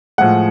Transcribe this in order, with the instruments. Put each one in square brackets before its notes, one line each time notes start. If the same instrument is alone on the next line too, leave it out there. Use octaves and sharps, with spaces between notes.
[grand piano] A2 F3 G#3 F#5